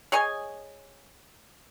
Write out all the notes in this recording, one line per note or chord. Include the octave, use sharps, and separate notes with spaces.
G#4 C#5 D#5 G#5